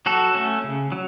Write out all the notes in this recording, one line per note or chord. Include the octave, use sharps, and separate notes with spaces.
F#3 F#4 A4
A3 C#4
C#3
F#3